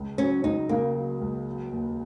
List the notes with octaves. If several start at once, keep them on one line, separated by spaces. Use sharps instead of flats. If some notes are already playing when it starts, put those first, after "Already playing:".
Already playing: C#2
F#3 C#4
C#2 D#4
C#3 A#3
F#3
C#2
F#3
D#2